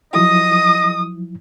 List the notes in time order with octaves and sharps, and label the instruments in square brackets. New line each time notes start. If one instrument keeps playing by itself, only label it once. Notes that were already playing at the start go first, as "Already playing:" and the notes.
[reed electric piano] F3 F#3 E4 [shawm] D#5 [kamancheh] D#6